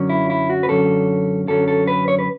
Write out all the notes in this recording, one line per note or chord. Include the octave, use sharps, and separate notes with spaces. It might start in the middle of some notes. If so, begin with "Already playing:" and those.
Already playing: F#2 D3 F#3 C#4
E4
E4
F#4
B4
F#2 D3 F#3 C#4 A4
F#2 D3 F#3 C#4 A4
A4
B4
C#5
B4